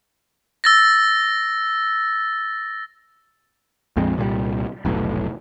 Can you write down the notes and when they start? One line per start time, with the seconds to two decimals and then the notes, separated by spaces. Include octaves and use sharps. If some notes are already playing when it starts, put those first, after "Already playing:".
0.64 E6 A6 A#6
3.96 A#1 F2 G#3 C4
4.17 C2 A#2 E3 G3
4.85 F1 B1 A2